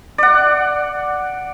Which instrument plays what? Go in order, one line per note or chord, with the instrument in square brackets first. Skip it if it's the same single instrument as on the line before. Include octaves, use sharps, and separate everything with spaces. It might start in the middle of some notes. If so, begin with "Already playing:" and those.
[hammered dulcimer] D5 F#5